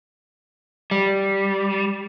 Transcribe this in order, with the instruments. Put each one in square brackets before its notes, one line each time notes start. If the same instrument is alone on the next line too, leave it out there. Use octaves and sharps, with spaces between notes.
[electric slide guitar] G3